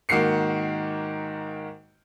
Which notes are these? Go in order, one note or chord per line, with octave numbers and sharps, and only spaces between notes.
G#2 D#3 A#3 F#4 C7 C#7